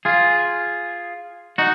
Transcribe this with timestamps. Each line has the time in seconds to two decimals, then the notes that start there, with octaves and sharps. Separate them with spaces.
0.05 F4 G#4
1.58 D#4 F#4